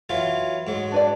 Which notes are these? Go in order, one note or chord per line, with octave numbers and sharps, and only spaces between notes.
E3 F#3 F4
G#2 F#3
D4 B4 D5